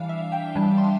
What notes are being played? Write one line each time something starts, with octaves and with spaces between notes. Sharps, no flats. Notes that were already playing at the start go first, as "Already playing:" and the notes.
Already playing: E3 G3 D4 F5
E5
G5
E3 G3 D4 A5
C6